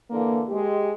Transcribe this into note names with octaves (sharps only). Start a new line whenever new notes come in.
D3 E3 A#3
G#3 G4